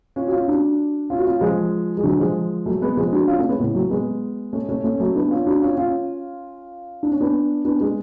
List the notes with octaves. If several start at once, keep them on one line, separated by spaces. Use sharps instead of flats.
C#4 F4
F#4
C#4 F4
D4 F#4
C#4 F4
F#4
C#4 F4
F3 G#3
G#3
D3 F#3
F3 G#3
F#3 A3
G#3 B3
F3 G#3
D4 F#4
C#4 F4
A3 C#4
G#3 B3
A2 C#3
F#3 A3
G#3 B3
A3 C#4
A3 C#4
A3 C#4
F#3 A3
B3 D4
C#4 F4
D4 F#4
C#4 F4
C#4 F4
D4
C#4
B3 D4
B3 D4
G#3 B3